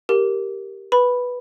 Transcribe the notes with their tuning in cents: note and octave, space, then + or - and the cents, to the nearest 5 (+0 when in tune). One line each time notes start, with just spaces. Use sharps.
G4 +0 A#4 +0
B4 -5 B5 +0